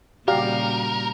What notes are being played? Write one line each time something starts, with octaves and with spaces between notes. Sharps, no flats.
A#2 C#3 G3 F#4 G4 A#4 D5 F5